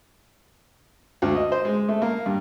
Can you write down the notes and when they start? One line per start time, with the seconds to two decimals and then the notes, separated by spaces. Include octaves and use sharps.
1.22 D2
1.35 D#5
1.52 C5
1.65 G#3
1.89 A3
2.02 A#3
2.26 G2